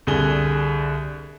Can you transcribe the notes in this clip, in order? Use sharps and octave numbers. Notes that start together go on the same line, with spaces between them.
C2 D3 G#4 G7